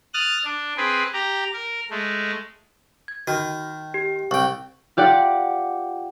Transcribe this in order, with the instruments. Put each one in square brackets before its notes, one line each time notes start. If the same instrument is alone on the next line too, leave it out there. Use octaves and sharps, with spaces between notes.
[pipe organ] D#6 F6 F#6 A6
D4
C4 G#4 B4
G4 A#5
A#4
G#3 A3
[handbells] G#6
[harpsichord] D#3 [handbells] F#4
[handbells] G4
[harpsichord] C2 G5 [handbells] C#6
[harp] F4 G4 D5 F#5